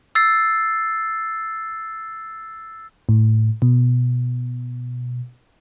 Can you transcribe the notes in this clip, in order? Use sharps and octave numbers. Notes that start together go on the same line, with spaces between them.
E6 A6 C7
A2
B2